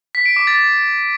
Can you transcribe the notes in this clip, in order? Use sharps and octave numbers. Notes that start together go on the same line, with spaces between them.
B6
D7
D6
A6